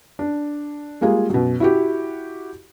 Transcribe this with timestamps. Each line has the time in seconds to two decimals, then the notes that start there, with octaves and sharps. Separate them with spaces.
0.19 D4
1.01 G3 G#3 A#3 F4 G#4
1.30 F#2 B2
1.60 E4 F#4 G4